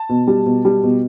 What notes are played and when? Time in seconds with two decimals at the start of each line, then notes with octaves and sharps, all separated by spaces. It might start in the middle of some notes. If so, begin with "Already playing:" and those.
Already playing: A5
0.09 B2
0.27 G3
0.46 B2
0.65 G3
0.83 B2